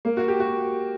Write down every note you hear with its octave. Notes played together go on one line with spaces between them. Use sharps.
A#3
F#4
G4
F#4